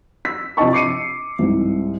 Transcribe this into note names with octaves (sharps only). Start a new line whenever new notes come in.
E6 B6
C3 F3 D4 D#5 A5 C#6
D6 C7 C#7 D#7
C2 G#2